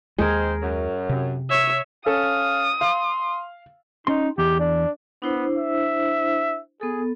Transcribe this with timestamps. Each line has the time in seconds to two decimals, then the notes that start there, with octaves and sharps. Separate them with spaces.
0.19 D#2 G#3 C4 D#4 G#4 A#4 C5
0.61 F#2
1.09 C3
1.50 C#5 E5
2.06 C#4 A4 F5 D#6
2.81 F5 C6
4.07 C#4 D#4 C6
4.38 E2 G4
4.60 D4
5.22 B3 D4 E4 C5
5.57 E5
6.81 B3 G#4 A4